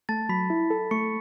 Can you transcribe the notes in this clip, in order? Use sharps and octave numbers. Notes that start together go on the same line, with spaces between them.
A3 A5 A6
F#3 B5 B6
E4
A4
A3 C#6 C#7